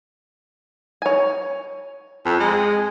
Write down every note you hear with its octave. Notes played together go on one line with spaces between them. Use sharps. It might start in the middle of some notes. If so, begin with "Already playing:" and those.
C#5 G#5
F2
G#3